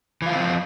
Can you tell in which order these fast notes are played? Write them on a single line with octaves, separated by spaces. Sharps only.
E3 F4 E4 C4 F3